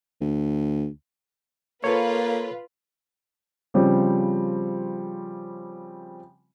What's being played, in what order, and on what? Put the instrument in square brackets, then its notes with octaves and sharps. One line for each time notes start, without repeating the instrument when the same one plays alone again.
[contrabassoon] D2
[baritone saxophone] A#3 [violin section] F4 B4 [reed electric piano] A4 C#5
[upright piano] C#3 F3 G3 C4